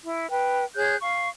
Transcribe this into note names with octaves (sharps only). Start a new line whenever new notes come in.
E4
B4 G5
G#4 C#5 F#6 G6
F5 C#6